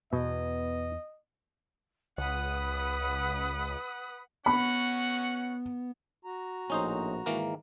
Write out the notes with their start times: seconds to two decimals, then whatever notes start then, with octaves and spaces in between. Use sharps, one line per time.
0.13 E2 B2 B3 D#5
2.18 C#2 B4 F#5 D#6
4.46 B3 C#4 F#4 F#5 B5
6.25 F#4 A#5
6.70 A#1 A2 C#4 D#4 C5
7.26 G#2 D#3 E3 G#3 A#3 A#4